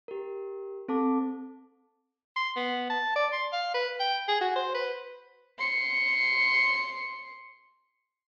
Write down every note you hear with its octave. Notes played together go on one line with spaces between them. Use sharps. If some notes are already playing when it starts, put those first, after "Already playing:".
G4 A#4
C4 A4 A5 D6
C6
B3
A5
D5
C6
F5
B4
G5
G#4
F#4
C5
B4
C6 C#7